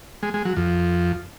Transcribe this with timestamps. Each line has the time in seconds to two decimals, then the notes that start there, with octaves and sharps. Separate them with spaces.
0.23 G#3
0.34 G#3
0.45 F#3
0.57 F2